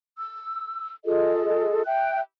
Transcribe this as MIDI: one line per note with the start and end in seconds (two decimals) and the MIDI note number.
0.18 0.92 88
1.06 1.82 65
1.06 1.82 68
1.06 1.82 69
1.06 1.82 75
1.86 2.19 76
1.86 2.19 79
1.86 2.19 90